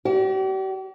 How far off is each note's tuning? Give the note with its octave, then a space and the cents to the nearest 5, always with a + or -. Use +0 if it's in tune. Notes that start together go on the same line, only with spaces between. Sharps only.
G4 -45 D5 -10